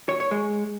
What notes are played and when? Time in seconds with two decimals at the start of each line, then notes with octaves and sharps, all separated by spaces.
0.09 C#5
0.20 C#5
0.31 G#3